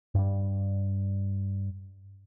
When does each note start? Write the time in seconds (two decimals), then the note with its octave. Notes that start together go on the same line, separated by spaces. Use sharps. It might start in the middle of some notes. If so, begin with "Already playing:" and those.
0.15 G2 G3